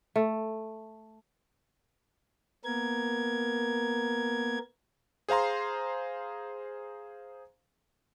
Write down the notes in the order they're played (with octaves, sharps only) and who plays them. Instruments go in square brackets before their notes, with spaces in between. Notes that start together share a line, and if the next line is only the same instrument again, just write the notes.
[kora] A3
[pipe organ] A#3 B3 A#4 G#6
[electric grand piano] G#4 C5 F5 A#5 C6